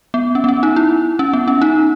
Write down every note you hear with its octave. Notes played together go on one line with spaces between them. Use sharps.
B3
C#4
B3
C#4
D#4
E4
C#4
B3
C#4
D#4